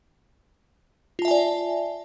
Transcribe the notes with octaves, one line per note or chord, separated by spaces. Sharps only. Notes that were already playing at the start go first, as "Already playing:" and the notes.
F4 D5 E5 G#5 A5